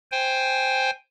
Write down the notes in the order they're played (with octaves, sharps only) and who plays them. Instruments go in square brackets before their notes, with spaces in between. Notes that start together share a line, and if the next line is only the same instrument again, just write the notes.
[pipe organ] C5 G5 G#5